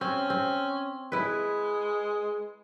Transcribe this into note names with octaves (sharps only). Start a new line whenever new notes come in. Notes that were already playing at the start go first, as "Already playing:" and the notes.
C4 C#4
C4
G#3 E4 B4